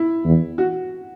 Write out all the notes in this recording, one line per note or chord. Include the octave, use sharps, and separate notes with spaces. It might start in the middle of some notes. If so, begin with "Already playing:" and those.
Already playing: E4
E2
F#4